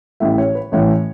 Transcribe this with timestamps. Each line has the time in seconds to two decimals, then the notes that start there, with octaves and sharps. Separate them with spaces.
0.20 A1 A2 E3 E5
0.38 C#5
0.55 B4
0.72 A1 A2 E3 C#5